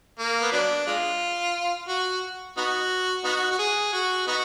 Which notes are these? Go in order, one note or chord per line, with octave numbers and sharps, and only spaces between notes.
A#3
B3
F#3 B3 D4
G#3 D4 F4
F#4
B3 D#4 F#4
B3 D#4 F#4
F#4
G#4
F#4
B3 D#4 F#4